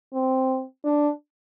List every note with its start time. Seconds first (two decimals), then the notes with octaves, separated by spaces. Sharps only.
0.14 C4
0.84 D4